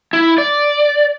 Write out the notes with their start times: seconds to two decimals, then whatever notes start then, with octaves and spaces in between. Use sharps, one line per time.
0.13 E4
0.38 D5